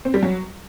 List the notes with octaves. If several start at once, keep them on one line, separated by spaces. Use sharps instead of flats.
C4
G3
F#3